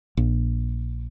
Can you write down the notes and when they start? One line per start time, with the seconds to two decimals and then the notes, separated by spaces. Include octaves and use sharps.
0.17 A#1